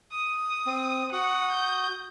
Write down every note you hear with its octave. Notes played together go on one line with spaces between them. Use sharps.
D#6
C4
F#4 F#5 D#6
G6